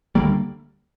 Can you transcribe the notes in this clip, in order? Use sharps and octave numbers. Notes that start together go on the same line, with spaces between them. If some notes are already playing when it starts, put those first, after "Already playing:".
D2 D3 G3 A#3